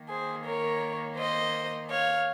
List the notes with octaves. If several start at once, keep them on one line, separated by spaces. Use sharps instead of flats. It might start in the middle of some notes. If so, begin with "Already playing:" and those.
Already playing: D#3 A#3
G#4 C5
A#4 C#5
C5 D#5
C#5 F5